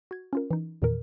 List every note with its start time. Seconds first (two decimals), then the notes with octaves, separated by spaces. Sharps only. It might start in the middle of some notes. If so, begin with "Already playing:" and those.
0.11 F#4 G#6
0.33 C#4 F4 A#4
0.51 E3 D#4
0.82 E2 A#2 D#3 E3 A#4